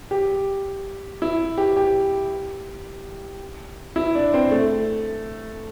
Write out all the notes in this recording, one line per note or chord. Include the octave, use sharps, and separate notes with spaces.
G4
E4
G4
G4
E4
D4
C4
A3